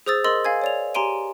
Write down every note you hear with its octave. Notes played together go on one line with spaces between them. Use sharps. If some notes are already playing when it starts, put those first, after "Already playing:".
G#4 C5 D#6 E6 A6
A#4 D#5 C6 E6 A6 F#7
F5 G#5 G#6
C#5 D5 F7
G4 G#5 A#5 C6 D7 D#7